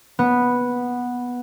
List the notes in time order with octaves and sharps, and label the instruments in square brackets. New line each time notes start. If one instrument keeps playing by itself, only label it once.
[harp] B3